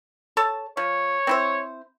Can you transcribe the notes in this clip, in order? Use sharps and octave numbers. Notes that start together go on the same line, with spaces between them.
A4 C#5 A5
F3 C#5
C4 E4 C5